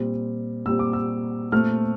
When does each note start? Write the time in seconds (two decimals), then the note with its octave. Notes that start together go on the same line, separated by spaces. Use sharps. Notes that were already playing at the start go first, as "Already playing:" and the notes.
Already playing: A#2 G3 C4
0.66 A#2 G3 C4 E6
0.79 D6
0.93 E6
1.52 A#2 A3 C4 F6